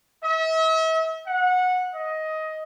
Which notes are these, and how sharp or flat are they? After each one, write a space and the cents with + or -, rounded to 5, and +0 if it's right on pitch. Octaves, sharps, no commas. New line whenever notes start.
E5 -40
F#5 -20
D#5 +15